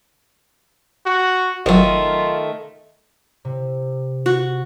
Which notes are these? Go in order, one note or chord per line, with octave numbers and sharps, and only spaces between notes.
F#4
G1 D#3 F#3 A3 F4
C3
F#4